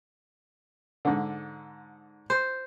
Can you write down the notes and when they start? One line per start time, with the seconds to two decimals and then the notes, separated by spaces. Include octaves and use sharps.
1.05 G#2 D3
2.30 C5